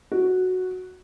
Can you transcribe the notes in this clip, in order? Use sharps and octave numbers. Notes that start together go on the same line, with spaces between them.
F#4